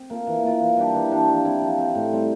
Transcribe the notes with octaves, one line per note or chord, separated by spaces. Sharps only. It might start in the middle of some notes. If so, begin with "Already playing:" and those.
Already playing: C4
A#3 F4
E3
A#3 F4
E3
G3 D4 G4
E3
G3 D4 G4
F3
C4 E4
F3
C4 E4
A2
G3 C4